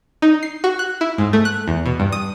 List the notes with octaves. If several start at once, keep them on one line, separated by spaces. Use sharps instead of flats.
D#4
C7
F#4
F#6
E4
G#2
A3
F#6
E2
B2
G2
D#6